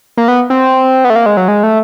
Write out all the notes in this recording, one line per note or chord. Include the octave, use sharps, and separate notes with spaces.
A#3
B3
C4
B3
A3
A#3
G#3
F#3
G#3
A3